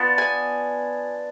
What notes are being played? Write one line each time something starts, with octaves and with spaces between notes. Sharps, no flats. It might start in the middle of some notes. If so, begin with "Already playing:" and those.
Already playing: B3 D4 F4
G#5